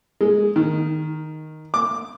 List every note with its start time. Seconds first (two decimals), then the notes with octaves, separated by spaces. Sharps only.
0.21 G#3
0.56 D#3
1.74 D6